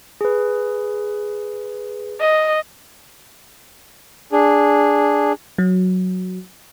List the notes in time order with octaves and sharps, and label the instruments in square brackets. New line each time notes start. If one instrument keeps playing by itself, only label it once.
[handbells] G#4 B4
[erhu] D#5
[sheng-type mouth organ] D4 G#4
[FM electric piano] F#3